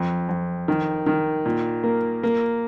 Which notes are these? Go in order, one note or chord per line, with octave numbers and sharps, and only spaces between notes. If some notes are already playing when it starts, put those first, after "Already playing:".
Already playing: F2
F2
D#3
D#3
A#2
A#3
A#3